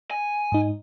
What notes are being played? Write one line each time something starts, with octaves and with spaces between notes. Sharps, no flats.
G#5
G#2 D#4